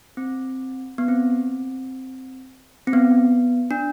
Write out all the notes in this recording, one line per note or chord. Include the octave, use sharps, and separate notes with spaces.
C4
B3
C4
C4
B3
D4